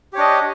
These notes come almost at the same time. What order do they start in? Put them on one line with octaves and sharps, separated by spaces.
G4 C#5 D4 D#5